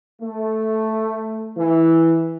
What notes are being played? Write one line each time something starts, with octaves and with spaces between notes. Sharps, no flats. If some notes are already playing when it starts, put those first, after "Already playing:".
A3
E3